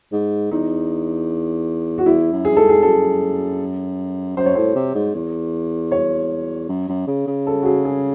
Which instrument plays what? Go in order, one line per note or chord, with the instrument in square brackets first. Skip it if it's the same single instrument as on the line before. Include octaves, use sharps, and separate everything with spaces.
[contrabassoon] G#2
[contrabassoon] E2 [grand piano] D#4
[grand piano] F#4
[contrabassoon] E2 [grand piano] E4
[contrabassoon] F#2
[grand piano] G#4
[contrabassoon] F#2
[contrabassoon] G#2 [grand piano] A4
[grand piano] G#4
[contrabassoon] F#2 [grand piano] A4
[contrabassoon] F#2 [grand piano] C5
[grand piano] C#5
[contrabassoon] A2 [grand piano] C5
[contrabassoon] C3
G#2
E2
[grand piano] C#5
[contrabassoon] F#2
F#2
C#3
C#3
[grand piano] A4
F#4
G#4
G#4